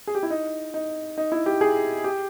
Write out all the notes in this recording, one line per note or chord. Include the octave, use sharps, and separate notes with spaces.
G#4
G4
E4
D#4
D#4
D#4
E4
G4
G#4
G4